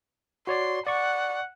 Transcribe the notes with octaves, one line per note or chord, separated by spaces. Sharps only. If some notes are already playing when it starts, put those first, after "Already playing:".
F#4 C#5 D5 C6
D5 F#5 C#6